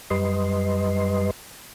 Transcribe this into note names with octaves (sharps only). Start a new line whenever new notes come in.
F#2 G3 B4 D#5 C6